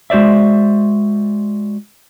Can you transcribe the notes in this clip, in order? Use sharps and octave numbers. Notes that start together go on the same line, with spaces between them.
G#3 F#4 C5 D5 E5